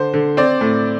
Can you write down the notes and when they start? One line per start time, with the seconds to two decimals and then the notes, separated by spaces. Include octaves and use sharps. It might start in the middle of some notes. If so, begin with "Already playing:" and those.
Already playing: D3 C5
0.14 D3
0.37 C4 D5
0.61 A2